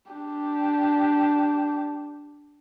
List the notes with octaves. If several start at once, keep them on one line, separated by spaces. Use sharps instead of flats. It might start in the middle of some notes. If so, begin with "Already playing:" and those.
D4 G4